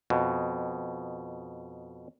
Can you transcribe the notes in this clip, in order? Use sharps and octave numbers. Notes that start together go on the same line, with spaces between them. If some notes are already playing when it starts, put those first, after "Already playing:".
F2 B2